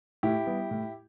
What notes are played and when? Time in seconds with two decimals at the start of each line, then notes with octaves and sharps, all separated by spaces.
0.23 A2 E4 G4
0.47 G3 B3
0.71 A2